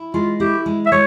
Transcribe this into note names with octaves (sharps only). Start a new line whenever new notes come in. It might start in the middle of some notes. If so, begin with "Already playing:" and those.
Already playing: E4
G#3 F4
E4 G4
G#3
E5
G#3 C#5